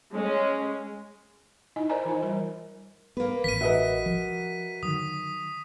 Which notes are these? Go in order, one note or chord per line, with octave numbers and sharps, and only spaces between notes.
G#3 C#4
D#4 E4 D#5 G#5
A#4 C5 D5 D#5 G#5 A#5
E3 D#4 F4 C5
E3 G3 A#4
A#3 B3 B4
A1 E3 B6 D#7
F#4 A#4 B4 D#5 E5
F3
D3 D#3 F#3 D#6